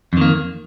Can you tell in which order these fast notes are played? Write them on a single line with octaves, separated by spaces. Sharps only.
F2 D#3 A#3